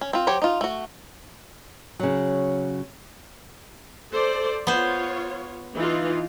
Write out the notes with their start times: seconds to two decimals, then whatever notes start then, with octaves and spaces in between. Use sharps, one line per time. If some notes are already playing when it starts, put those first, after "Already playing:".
0.01 C#4
0.13 C4 F4
0.27 F#3 G4 C5 C#5
0.42 D#4 F4
0.61 A3 F#4
1.99 C#3 F#3
4.11 A4 C5 D5
4.67 B3 F4 C5 C#5
5.75 E3 D#4 F4